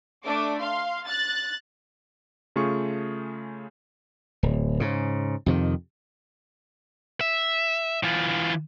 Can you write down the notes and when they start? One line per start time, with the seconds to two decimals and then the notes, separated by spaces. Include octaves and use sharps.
0.25 A3 D4 D6
0.60 F5 C6
1.07 F#6 A6
2.56 C#3 A3 F4 G#4 C#6
4.43 D1
4.80 G#2 C#3
5.46 F2 C3 D#3
7.21 E5
8.03 E3 F4